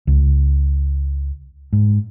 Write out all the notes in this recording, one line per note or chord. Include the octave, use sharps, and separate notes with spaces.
C#2
G#2